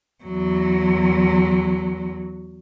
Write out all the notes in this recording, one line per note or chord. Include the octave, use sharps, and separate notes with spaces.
E2 F#3